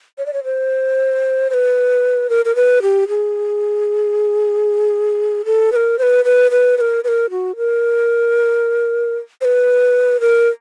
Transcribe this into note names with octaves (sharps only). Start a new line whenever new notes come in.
C#5
D5
C#5
C5
C5
B4
A#4
A#4
B4
G4
G#4
A4
B4
A#4
C5
B4
B4
B4
B4
A#4
B4
A#4
F#4
A#4
C5
B4
A#4